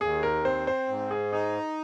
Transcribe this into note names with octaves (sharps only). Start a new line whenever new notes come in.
D#2 G#4
A#4
C4 C5
C5
G#2
G#4
D#4 G#4